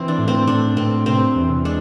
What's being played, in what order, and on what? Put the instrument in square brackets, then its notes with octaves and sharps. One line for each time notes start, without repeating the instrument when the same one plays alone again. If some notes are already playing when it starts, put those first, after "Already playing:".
Already playing: [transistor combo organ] E3 [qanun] C4
[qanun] D4
[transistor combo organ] A2
[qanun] C4
[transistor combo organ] A2 [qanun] D4
[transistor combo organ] A2 [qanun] C4
[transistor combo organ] C3 [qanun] C4
[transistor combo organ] E2
[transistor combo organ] G#3 [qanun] D4